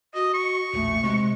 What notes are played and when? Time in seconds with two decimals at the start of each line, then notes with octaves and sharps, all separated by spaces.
0.15 F#4 D#5
0.34 C#6
0.73 E1 A#1 A3
1.03 C3 G#3